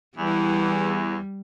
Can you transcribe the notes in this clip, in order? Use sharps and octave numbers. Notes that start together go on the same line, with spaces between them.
E2 E3 G3